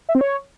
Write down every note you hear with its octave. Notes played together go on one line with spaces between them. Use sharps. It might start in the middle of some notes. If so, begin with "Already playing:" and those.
E5
C4
C#5